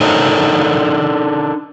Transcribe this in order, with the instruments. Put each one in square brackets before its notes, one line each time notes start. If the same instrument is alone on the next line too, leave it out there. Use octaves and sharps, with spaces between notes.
[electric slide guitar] D4 D#4 A4 A#4 C5 C#5